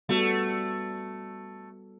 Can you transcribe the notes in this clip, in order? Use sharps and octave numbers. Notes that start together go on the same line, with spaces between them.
G3 A3 B3 F#4 A4